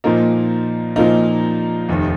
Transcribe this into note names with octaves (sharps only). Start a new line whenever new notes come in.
A#2 F3 A#3 D#4
A#2 F3 A#3 D#4
F1 D#2 D#3